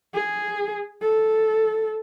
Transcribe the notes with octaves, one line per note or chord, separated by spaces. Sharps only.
G#4
A4